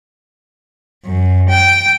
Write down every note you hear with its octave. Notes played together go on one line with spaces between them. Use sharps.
F#2
G5